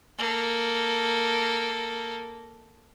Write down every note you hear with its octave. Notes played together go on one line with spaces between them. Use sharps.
A#3 A4